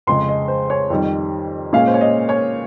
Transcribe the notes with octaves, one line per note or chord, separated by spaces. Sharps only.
F2 C#3 G#3 C6
D#5
C5
C#5
F2 D#3 G3
A#2 G#3 C#4 F5
C5
C#5
D#5
C#5